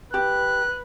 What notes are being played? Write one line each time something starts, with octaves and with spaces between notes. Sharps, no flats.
G4 B4 F#6